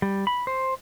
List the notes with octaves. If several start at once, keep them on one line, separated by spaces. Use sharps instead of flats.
G3
B5
C5